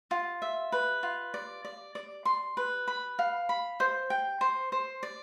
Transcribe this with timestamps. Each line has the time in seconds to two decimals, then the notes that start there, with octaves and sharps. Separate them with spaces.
0.11 F4
0.42 E5
0.72 B4
1.03 F4
1.34 D5
1.65 D5
1.95 D5
2.25 C6
2.57 B4
2.88 B5
3.19 F5
3.49 B5
3.80 C5
4.10 G5
4.41 C5
4.72 C5
5.03 D5